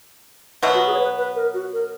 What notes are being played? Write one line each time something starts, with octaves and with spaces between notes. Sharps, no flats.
B2 F#3 B3 E5
F#4
G#4
C#5
B4
B4
A#4
F#4
A#4